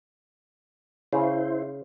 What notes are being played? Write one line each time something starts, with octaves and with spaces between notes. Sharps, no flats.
C#3 E4 C5